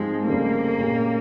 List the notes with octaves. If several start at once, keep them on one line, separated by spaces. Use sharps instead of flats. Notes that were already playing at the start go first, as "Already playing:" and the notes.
Already playing: G#2 F3 G#3 C4 G4
F1 F2 C#3 G3 A#3 C4
A#2 G#3 C#4 G4